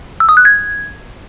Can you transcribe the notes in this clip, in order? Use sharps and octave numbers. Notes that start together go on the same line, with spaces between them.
E6
D#6
F#6
G#6